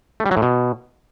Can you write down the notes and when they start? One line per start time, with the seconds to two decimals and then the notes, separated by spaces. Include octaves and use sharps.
0.20 A3
0.26 G3
0.31 F#3
0.37 A2
0.42 B2